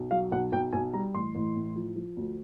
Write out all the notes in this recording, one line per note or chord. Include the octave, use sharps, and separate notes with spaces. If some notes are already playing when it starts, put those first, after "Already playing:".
Already playing: B1
F#3 F5
B1 F#5
B1 G5
B1 G#5
G3 A#5
A1 C6
A1
A2
F3
F3
D2